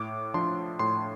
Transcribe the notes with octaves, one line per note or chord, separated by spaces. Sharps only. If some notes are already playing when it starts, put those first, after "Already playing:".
Already playing: A2 D6
F3 D4 C6
A2 C6